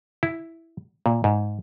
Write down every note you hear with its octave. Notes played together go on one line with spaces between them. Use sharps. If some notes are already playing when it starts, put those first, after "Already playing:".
E4
A#2
G#2